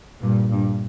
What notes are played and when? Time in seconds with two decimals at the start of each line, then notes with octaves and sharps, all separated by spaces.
0.21 G2 A#2
0.52 G2